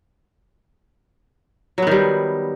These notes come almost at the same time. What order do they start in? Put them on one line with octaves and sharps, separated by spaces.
F#3 B3 D#3 G3